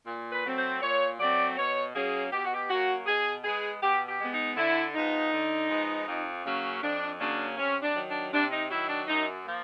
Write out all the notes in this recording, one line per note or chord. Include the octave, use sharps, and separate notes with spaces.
A#2
B4
F#3 A3 C4
C5
A#2 C#5
F#3 A3 C4 D5
B2 C#5
F#3 A#3 C#4 G#4
B2 G4
F#4
G4
F#3 A#3 C#4 F#4
B2 G#4
G#3 B3 G#4
B2 G4
G4
G#3 B3
D#4
D3 E4
F3 G#3 B3 D#4
D3
F3 G#3 B3
F2
C#3 F#3 A#3 C#4
F2 D4
C#3 F#3 A#3 C#4 D4
C3 C#4
D4
D#3 F#3
D4
C3 D4
D#4
D#3 F#3 E4
D4
F#2 D#4
F3 A#3